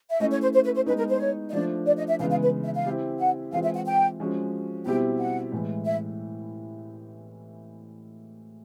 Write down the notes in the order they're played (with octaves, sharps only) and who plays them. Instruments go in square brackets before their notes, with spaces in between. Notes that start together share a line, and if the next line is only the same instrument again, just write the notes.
[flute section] E5
[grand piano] A3 C#4 E4 [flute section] D#5
[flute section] C#5
C5
C5
B4
C5
[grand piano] G#3 B3 D#4 [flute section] B4
[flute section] A#4
C5
C#5
D#5
[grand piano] F3 A3 D4 [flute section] D5
[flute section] D5
D#5
E5
[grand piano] C#3 E3 G#3 B3 [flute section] F5
[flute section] F5
B4
E5
F5
[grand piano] C4 E4 G4
[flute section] F#5
[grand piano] E3 G#3 C4 F4 [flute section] F5
[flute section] E5
F#5
G5
[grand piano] F3 G#3 C#4 F#4
[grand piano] B2 G3 C4 E4 G4 [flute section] G5
[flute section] F#5
[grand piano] A2 E3 G#3
[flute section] E5